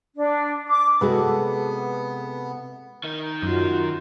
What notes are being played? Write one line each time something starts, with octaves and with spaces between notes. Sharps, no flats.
D4
D6
C3 G#3 B3 F#4 G#4 A4 B4
D#3 D#4
F#2 F4 F#4